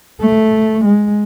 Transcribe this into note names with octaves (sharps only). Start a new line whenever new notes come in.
A3
G#3